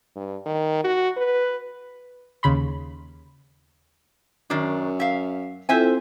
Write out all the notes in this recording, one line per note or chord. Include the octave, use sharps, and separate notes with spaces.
G2
D#3
F#4
B4
D#2 C#3 B5 C6
F#2 D#3 D4
E5 F5
C4 E4 F4 A4 C5 E5 G#5